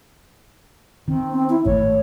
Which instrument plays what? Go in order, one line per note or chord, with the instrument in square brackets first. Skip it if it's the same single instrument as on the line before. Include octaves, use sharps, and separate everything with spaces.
[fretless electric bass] D#3 [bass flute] C4
[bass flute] C4
E4
[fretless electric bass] G#1 A2 [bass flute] C#5